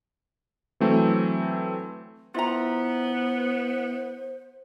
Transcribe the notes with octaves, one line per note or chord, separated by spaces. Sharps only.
E3 F#3 A3 C4
B3 E4 F4 C5 E5 A#5